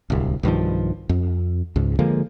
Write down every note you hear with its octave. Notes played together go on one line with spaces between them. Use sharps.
D1 C2
B1 G2 D#3 F3
F2
C#2 G#2
D3 F3 G#3 A#3